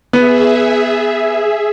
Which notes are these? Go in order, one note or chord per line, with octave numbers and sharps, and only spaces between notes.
B3 G#4 E5